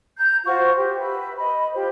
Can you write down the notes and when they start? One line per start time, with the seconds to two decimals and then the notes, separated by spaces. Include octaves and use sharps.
0.16 A#5 G6
0.45 F4 F#4 C5 C#6
0.75 G4
0.97 B4 E5
1.37 D#5 B5
1.73 F4 G4 C5